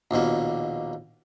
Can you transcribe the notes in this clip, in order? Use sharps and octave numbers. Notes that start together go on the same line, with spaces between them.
A#1 D#2 B2 A#3